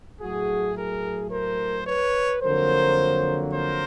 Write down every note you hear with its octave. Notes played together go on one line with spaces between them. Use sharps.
A2 F#3 A3 F#4 G#4
G#4 A#4
A#4 C5
B4 C#5
F2 D3 F#3 A#3 A#4 C5
A#4 C5